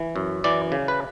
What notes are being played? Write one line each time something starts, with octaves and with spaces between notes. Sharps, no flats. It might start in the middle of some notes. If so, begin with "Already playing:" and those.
Already playing: E3
F#2
E3 D5
C#3
B4